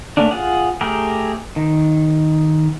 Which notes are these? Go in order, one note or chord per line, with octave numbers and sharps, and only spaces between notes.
A3 A#3 C#4 D4
F4 G#4 F#5
A3 G4 G#4 A#4
D#3